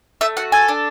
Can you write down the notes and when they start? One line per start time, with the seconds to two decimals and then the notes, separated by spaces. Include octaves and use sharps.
0.21 A3 E5
0.37 F#4 F#5
0.52 A4 G#5
0.68 D4